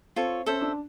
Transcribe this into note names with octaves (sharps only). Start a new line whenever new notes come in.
C4 F4 A4 C#5
C#4 A4 C5 E5
D4